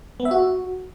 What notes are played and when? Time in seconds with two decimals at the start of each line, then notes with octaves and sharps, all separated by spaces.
0.20 B3
0.25 E5
0.31 F#4